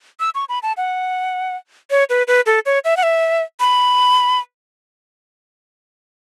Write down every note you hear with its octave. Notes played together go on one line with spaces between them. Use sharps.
E6
C#6
B5
A5
F#5
C#5
B4
B4
A4
C#5
E5
F#5
E5
B5